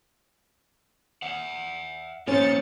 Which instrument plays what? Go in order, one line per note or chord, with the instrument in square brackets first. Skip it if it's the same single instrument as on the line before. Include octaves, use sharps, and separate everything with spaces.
[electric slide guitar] E5 F#5
[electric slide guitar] A#3 D#4 E4 [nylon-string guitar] C#4 [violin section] C5 A6 C#7